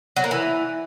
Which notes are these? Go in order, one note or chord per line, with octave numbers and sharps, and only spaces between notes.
F#3
A#3
E3